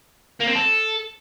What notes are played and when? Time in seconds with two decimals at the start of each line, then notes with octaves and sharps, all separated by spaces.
0.41 A#3
0.48 C4
0.56 A4